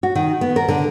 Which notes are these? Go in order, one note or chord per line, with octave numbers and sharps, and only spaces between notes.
F#4
D#3
B3
A#4
D3